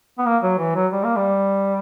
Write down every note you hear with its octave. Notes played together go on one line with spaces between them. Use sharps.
B3
A#3
F#3
E3
F#3
G3
A#3
G3